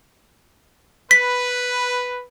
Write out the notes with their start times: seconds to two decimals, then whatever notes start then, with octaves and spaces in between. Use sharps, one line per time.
1.11 B4 B6